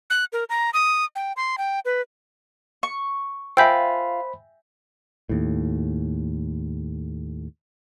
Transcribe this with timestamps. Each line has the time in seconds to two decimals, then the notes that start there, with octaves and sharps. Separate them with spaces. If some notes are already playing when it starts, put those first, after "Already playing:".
0.10 F#6
0.33 A#4
0.50 A#5
0.74 D#6
1.16 G5
1.37 C6
1.58 G5
1.85 B4
2.83 C#6
3.57 F4 C5 E5 G5 G#5 B5 E6 G6
5.29 D#2 A2